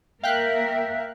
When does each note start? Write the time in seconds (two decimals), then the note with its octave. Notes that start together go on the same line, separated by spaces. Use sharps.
0.23 A#3 A#4 E5 F5 G5 F#6